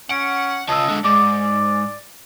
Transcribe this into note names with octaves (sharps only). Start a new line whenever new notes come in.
C#4 F#5 D7
C#3 F4 D#5 A5 E6
G#2 D3
G#2 D5 D6